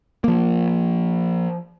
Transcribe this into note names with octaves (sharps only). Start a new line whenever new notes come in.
F3 A#3